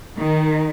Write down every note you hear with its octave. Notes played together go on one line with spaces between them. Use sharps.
D#3